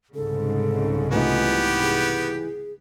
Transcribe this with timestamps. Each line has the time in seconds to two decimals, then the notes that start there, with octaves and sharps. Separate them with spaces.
0.15 C2 G#2 C#3 A4
1.12 E3 A3 B3 D#4 F4 G4
1.81 G#4